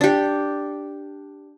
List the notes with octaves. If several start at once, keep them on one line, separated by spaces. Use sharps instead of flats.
D4 G4